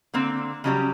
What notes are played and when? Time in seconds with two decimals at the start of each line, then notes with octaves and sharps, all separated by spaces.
0.14 D3 A#3 C4
0.64 C#3 F#3 G3 C#4